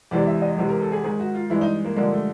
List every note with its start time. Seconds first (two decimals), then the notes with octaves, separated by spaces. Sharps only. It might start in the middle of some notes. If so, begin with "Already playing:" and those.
0.11 E2 C3 E3 G#3 D5
0.27 E5
0.42 D#5
0.57 E2 C3 E3 G#3
0.69 A#4
0.81 A4
0.92 G#4
1.03 G#2 D#3 G#3 G#4
1.19 F#4
1.34 F4
1.50 G2 E3 G#3 E4
1.61 D#4
1.85 A#3
1.96 G2 D3 F3 G#3 A#3
2.12 A3